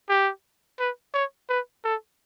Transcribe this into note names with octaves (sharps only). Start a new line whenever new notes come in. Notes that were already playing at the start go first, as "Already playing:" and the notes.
G4
B4
C#5
B4
A4